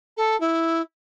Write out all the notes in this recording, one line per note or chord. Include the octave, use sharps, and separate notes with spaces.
A4
E4